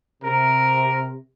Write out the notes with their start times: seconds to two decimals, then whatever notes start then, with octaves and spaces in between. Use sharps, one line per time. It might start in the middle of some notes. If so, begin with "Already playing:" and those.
0.23 C3 A#4